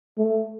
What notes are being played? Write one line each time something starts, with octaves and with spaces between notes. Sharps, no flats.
A3